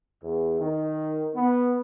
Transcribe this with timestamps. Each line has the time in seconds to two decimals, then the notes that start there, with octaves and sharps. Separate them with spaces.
0.23 E2
0.61 D#3
1.35 B3